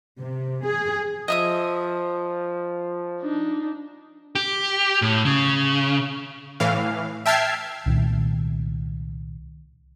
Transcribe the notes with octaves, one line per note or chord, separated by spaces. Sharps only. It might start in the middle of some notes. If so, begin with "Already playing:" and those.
C3
G#4
F3 D#5 E5 D#6
D4 D#4
G4
A2
C#3
A2 E3 F5
E5 G5 A5 F6 G#6 C7
C2 A#2 D#3